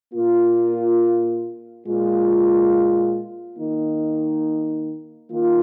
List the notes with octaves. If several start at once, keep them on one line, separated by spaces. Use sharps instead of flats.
A#2 A#3 F4
A#2 G#3 F4
D#3 A#3 D#4
D#3 A#3 F4